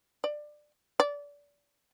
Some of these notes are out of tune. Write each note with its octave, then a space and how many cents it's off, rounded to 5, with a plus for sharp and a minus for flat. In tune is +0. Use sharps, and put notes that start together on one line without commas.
D5 +20
D5 -25